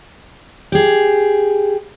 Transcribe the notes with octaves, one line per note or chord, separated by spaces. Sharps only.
G4 G#4